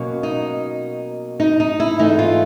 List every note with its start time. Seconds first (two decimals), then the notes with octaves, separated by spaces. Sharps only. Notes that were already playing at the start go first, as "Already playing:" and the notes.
Already playing: B2 F#3 A#3 C#4
0.23 D#4
1.40 D#4
1.60 D#4
1.80 E4
1.99 G#2 E3 A3 D#4
2.19 F4